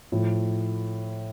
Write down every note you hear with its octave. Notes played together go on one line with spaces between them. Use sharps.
A2 F3 A3